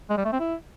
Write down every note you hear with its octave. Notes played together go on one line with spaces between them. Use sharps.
G#3
G3
A3
C4
E4